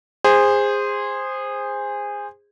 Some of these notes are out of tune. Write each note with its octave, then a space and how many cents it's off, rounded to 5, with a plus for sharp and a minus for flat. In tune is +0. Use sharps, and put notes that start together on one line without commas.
G#4 -20 C5 +0